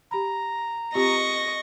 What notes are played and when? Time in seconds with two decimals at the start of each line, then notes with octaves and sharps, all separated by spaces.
0.11 G4 A#5 B5
0.95 C4 F4 G4 D#5 C#6 A#6